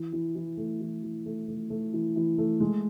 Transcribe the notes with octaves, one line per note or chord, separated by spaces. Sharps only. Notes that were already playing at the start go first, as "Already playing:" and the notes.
Already playing: E3
E3
E3
A3
E3
E3
A3
A3
A3
E3
E3
A3
G#3